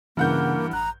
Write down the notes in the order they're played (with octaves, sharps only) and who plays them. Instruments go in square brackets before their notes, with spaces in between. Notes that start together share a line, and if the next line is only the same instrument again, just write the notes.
[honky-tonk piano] G2 F#5 G6 [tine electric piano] C#3 C#4 [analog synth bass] E3 [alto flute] A#3
[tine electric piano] A1 F#6 [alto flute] A#5